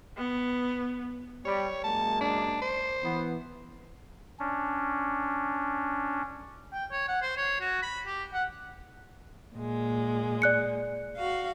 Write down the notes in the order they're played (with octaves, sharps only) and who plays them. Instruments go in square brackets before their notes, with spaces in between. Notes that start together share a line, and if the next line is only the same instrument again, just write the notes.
[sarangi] B3
[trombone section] G3 [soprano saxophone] C#5
[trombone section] F#2 G#3 A#3 [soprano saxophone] A5
[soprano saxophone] D4
C5
[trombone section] E3 B3
[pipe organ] C#4 D4
[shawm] G5
C#5
F#5
C5
C#5
F#4
B5
G4
F#5
[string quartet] A#2 G#3
[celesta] D5 F#6 C#7
[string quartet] F#4 F5